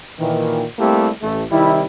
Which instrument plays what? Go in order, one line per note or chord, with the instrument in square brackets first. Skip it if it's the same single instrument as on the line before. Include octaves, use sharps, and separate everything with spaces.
[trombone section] A#2 D#3 E3
G3 A3 A#3 C4 E4 G4
A1 A3
C3 D#3 G3 E4